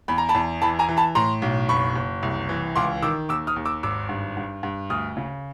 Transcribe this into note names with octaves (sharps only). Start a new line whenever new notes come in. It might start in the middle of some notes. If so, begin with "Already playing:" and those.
E2 B5
A#5
A5 B5
E2
E3 A5 B5
G#5 A#5
E3
A5 B5
A2 A#5 C6
B1
F#1 B5 C#6
F#1
C2
E3
C#2 C6 D6
D#3 D6 E6
D#2 D6 E6
D#6 F6
D#2
D6 E6
G#1 D6 E6
G2
G2
G2
D2 D#6 F6
C#3